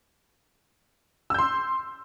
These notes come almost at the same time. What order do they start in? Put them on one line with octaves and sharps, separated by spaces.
E6 G6 C6